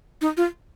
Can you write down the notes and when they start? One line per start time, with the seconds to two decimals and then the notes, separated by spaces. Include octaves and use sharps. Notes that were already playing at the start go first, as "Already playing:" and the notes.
0.21 D#4
0.37 F4